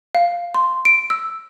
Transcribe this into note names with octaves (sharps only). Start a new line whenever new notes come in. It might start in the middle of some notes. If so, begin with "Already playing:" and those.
F5
C6
D7
E6